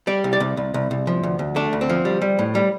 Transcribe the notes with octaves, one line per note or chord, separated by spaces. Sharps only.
G3 D5
C2
D5
C2
C2
C2
C2
F3
D2
D2
A3 D4
D2
C4
F3
G3
G3
A2
G3